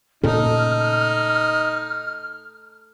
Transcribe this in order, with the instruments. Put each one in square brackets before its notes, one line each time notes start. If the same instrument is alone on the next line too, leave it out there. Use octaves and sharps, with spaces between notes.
[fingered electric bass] A#2 C#3 [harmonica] D#4 [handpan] A4 [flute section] F6